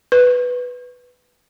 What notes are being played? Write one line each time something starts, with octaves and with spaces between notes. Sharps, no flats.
B4